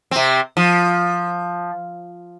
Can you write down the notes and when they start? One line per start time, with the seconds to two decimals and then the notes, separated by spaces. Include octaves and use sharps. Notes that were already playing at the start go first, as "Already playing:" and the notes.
0.11 C3 C4
0.57 F3